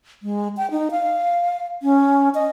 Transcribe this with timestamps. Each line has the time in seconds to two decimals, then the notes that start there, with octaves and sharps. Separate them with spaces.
0.23 G#3
0.57 G5
0.71 D#4
0.91 F5
1.83 C#4
2.35 D#5